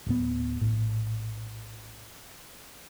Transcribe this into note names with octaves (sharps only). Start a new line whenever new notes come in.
D1 A2 B3
A#1 A2